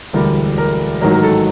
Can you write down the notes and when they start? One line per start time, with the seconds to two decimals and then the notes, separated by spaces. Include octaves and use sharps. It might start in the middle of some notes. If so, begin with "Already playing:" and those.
0.13 E1 D2 D3 G3 A#4
0.58 A#4
1.01 A1 G#2 D#3 F#3 A#4
1.14 A#4
1.23 A4